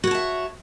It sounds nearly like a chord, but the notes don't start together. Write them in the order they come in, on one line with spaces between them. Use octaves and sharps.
F#4 C#5 A5 E5